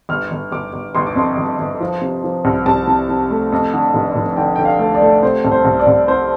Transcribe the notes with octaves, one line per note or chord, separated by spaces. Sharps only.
G1 F6
G1
G1 D6
G1
G1 C6
D6
F2 C6
G1
G1
F3
C3
F3
C2
C2 A5
C3
C3
A3
F2
D3
F1
F1
D3 G5
D3 G5
F5
A3
D5
A3
C3 C5
C2
C5
C2
D5
C2
C4 C5